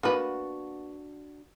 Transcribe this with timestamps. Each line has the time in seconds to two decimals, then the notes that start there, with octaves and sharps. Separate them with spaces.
0.03 A#3 B3 D4 F#4 B4